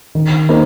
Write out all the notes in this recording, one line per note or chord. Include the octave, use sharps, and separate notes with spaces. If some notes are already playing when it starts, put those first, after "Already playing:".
D#3
A#3 D#4 C5